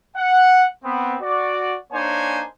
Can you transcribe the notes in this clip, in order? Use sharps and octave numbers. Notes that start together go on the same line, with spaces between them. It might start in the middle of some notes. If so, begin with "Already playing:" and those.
F#5
B3 C4
F#4 D5
A#3 D4 D#4 C5 C#5 G#5